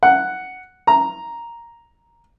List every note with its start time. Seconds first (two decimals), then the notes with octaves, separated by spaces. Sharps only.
0.03 F#5
0.87 A#5